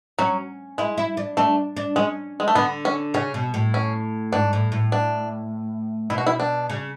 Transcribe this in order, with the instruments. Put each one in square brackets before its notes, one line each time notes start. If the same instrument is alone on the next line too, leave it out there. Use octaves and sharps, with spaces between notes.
[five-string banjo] F#3 [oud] C#4
[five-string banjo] G#3 [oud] E4
[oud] E4
D4
[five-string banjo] A3 [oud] D4
[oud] D4
[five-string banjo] G#3 [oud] C#4
[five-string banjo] G#3
A3
[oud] D3 [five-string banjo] B3
[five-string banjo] C#4
[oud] C#3 [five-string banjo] C#4
[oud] B2
A2
[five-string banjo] C#4
[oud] G#2 [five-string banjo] D4
[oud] A2
A2
[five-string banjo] D4
[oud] B2 [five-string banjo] E4
[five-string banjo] F#4
E4
D4
[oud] C#3